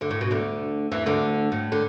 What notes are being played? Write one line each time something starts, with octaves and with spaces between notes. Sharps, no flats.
D2 D3
A2
B2
D2 D3
E2 E3
D2 D3
A2
D3